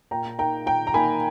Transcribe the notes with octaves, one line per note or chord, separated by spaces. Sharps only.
A#2 G5 A#5
A#3 D#4 G5 A#5
A#2 G5 A#5
A#5
A#3 D#4 G#5 B5